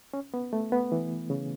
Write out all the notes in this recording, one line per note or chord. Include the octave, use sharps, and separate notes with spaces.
C#4
B3
A3
B3
E3
C#3